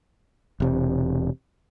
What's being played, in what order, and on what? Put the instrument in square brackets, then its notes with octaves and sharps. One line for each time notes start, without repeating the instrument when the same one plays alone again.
[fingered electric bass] E1 C3